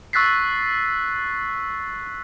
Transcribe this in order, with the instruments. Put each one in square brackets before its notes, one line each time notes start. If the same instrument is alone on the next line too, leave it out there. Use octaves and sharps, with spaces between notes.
[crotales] C#6 E6 F#6 A6 B6 C7